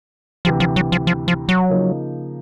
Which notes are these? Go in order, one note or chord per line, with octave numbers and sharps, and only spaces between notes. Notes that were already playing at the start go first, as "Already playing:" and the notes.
D2 C3 E3 F3
F3
F#3
F3
F3
F3
F#3
C#3 F3 A#3 D#4